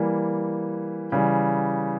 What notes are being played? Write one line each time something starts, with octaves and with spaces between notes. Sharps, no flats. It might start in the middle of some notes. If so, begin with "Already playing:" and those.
Already playing: E3 G3 A#3
C#3 E3 G3